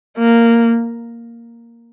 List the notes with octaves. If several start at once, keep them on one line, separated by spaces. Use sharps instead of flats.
A#3